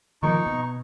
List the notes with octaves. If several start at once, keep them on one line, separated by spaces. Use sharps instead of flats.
D#3 F3 A#3 D#4 C#6
B2